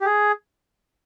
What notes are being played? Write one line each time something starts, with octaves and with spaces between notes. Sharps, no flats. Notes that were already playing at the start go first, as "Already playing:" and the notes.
G4
G#4